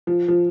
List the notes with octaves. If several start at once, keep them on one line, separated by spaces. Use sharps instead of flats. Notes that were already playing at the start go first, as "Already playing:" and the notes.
F3
F3